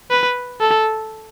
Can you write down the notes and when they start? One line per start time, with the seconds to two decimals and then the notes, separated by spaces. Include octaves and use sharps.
0.10 B4
0.60 A4